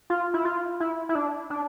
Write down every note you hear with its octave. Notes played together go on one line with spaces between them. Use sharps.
F4
E4
F4
E4
E4
D4
D4